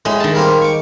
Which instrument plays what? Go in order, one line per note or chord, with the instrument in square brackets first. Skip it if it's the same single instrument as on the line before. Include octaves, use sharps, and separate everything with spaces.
[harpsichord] A2 [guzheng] G#3
[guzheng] D#3 A5
[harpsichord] G3 A#3 C4
C#6 D6